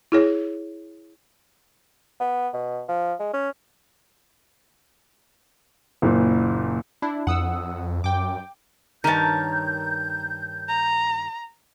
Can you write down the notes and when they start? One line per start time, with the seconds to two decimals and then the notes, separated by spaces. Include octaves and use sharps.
0.12 E4 G#4 C#5
2.20 B3
2.54 B2
2.89 F3
3.20 G#3
3.33 C#4
6.02 F#1 A#2
7.02 D4 E4
7.27 F2 F#5 D#6 E6
8.04 F#2 G5 D6
9.04 G2 D#3 A#4 C#5 A5 G6
10.69 A#5